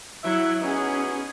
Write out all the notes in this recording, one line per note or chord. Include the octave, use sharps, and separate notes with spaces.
F#3 E4 E5
F#3 B3 C#4 D#4 G#4